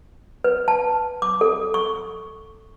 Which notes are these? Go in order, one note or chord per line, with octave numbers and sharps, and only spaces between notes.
B4
A5
D6
A4
C#6